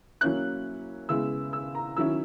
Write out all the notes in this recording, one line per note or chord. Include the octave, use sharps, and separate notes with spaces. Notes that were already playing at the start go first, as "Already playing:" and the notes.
F#3 A#3 C#4 E4 F#6
C#3 G#3 B3 E4 E6
E6
A#5
D#3 F#3 C#4 E4 E6